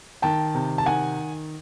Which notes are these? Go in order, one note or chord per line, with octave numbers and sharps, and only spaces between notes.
D#3 G5 A5
C3
A5
D#3 F#5 G#5